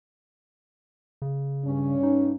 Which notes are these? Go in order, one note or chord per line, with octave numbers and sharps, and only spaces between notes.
C#3
G2 C#4
D#4